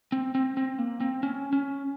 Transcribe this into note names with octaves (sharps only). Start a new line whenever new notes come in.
C4
C4
C4
A#3
C4
C#4
C#4